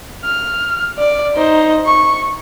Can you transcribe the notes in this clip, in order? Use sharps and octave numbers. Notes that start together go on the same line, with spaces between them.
F6
D5
D#4 C5
C#6